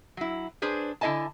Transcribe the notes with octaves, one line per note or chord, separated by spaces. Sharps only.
F#3 E4
D4 G#4 B4 C5
D3 E4 G#4 D#5 G#5 A5